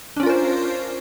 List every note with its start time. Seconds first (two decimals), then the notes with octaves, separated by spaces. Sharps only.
0.17 D4
0.20 C#4
0.23 F4
0.26 A#4
0.30 C5